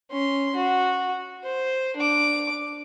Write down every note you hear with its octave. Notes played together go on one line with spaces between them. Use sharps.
C#4 C6
F#4
C5
D4 D6